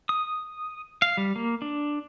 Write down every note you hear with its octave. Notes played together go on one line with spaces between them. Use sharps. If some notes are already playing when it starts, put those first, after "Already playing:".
D#6
F5
G3
A#3
D4